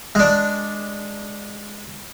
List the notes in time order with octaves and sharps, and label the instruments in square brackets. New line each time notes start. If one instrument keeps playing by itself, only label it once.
[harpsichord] G#3 D4